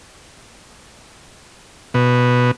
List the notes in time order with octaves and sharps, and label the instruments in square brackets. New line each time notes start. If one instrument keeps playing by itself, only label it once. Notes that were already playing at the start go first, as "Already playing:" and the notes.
[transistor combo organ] B2